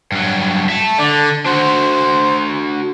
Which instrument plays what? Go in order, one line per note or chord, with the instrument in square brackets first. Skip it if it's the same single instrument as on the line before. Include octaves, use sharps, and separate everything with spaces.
[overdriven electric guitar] G2 F#3
E5 A5
[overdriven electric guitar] D3 [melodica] D4 D5
[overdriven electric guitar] D4 F#4 [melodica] C5